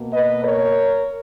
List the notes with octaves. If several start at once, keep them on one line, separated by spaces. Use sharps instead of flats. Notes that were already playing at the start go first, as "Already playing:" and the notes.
Already playing: B2 A#3
B4 D#5
A#4 C#5